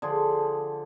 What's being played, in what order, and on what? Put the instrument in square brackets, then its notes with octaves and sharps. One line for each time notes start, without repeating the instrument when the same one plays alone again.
[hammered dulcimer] D3 F3 G#4 C6